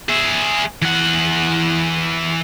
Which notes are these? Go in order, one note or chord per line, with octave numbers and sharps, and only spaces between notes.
G#4 E5
E3 F#5